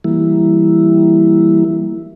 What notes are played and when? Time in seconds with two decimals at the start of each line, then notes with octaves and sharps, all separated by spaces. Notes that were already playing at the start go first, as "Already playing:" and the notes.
0.04 E3 G3 A#3 E4